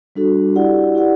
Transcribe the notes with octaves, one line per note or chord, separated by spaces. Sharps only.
G3 D4 F#4 A4
E4 G4 D5 F#5
E4 G4 B4 D5 F#5